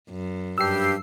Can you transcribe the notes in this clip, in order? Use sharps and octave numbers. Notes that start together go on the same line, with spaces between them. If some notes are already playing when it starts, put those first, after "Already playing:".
F#2
G2 G4 E6 C7